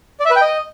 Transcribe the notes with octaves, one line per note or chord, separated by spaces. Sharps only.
D5
E5
B4
G5
D#5